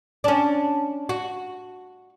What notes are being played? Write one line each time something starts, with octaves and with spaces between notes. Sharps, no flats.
C#4 D4
F#4